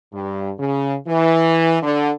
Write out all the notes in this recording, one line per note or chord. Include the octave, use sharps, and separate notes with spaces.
G2
C#3
E3
D3